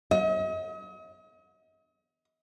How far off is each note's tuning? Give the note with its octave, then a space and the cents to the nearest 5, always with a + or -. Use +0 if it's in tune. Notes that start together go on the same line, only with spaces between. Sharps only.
D#5 +40